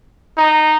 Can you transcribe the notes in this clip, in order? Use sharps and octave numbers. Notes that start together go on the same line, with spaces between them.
D#4